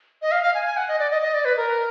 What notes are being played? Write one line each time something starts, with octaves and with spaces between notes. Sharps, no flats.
D#5
F5
F5
G#5
G#5
F#5
D#5
D5
D#5
D#5
D5
B4
A#4